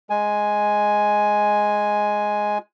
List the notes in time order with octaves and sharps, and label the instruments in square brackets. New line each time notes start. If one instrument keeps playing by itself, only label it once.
[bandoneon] G#3 G#5